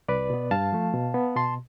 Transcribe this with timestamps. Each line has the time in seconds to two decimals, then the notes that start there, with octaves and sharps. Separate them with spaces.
0.08 C2 B4 D5
0.30 B2 B3
0.51 G2 F5 A5
0.73 F3 A3
0.94 B2
1.14 B3
1.36 B2 A5 C6